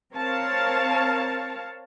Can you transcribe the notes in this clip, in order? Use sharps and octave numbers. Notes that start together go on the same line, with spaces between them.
C4 A#4 C#5 F5 A5